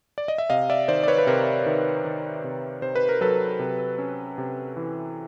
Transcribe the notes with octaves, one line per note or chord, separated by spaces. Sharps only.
D5
D#5
E5
C3 D#5 F5
D5 E5
D#3 C5 D5
D5
B4 C#5
B4
C3 A#4 C5
D#3
D#3
C3
C3 C5
B4
A#4
F#3 A4 B4
C3
C#4
C3
E3